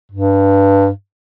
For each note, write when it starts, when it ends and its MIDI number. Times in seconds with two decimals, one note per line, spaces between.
0.12 0.89 43